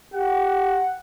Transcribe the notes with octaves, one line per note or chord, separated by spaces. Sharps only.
G4 F#5